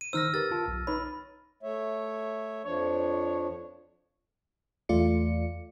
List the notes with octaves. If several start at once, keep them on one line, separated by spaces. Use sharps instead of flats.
D#7
D#3 D#4 C5 E6 F6 A#6
G4 A#4 B4 A6
F4 A5
B1
D#4 B4 C#5 B5
A3 C#5 E5
F2 F3 D4 C#5
E2 A3 F4 D5 C#7